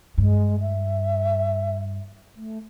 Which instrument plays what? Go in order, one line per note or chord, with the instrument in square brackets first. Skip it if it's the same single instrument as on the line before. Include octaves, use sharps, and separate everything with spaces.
[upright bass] G2 [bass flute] G#3
[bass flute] E5
A3